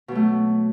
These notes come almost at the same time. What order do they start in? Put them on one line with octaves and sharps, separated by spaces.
B2 F#3 A3